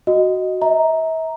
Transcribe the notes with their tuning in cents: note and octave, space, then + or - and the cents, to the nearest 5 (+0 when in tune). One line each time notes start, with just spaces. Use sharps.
F#4 +5 D#5 +0
E5 -40 A#5 +0